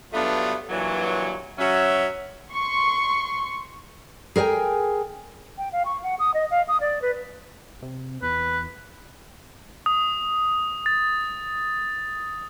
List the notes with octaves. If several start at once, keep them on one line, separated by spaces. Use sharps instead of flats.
G2 F#3 A3 B3 D4 F4
G2 A#2 E3 F#3
F#3 C#4 E5
C6 C#6
G#4 A#4 C#5 G5 G#5
G5
F5
C#6
F#5
D#6
D#5
F5
D#6
D5
B4
C3
E2 B4
D#6
A6